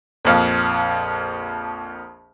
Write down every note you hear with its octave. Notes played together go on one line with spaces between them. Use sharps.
A#1 F2 F5